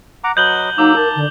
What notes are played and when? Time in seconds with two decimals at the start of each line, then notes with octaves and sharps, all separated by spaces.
0.24 F#5 A#5 D6
0.37 F#3 B4 D#5 G6 F#7 G7
0.78 F#3 A#3 D#4 D6 E6
0.96 A#4 A5
1.16 D3